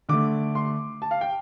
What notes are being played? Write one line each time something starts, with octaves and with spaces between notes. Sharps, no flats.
D3 A3 D6
C6
A5
F5
G5